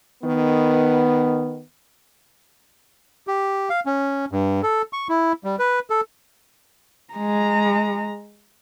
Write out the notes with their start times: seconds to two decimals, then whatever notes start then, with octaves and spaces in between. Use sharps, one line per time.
0.24 D#3 B3
3.27 G4
3.70 F5
3.86 C#4
4.32 G2
4.63 A4
4.93 C#6
5.09 E4
5.44 G3
5.59 B4
5.90 A4
7.14 G#3 A#5